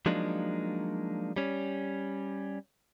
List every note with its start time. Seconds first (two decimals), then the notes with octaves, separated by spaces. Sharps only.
0.06 F3 F#3 G#3 A#3 D4 D#4
1.36 G3 C#4